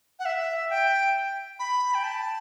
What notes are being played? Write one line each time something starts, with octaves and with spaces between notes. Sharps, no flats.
F#5
E5
G5
B5
G5
A5